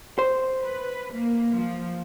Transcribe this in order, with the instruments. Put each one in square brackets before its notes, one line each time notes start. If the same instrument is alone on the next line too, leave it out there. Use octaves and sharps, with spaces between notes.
[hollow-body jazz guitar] C5
[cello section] B4
A#3
F3